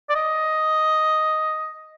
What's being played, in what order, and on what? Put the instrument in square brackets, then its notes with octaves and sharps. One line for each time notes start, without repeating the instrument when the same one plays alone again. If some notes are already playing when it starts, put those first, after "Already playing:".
[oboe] D5
D#5